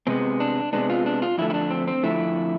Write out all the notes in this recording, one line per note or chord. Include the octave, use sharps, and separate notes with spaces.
C3 G#3 B3 C4
D4
C3 G#3 B3 D4
F4
D4
F4
F2 D3 A3 E4
E4
D4
C4
C4
F2 D3 A3 E4